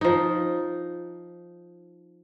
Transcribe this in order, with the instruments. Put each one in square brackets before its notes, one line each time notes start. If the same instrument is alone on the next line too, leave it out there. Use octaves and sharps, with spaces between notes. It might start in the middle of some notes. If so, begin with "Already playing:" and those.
[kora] F3 D#4